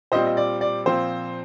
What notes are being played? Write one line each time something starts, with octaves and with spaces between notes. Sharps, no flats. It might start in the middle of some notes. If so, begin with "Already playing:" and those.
A#2 G3 C4 C5 D#5
D#5
D5
D5
A#2 F3 C4 C5